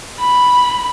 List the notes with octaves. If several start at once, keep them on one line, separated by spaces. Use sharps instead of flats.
B5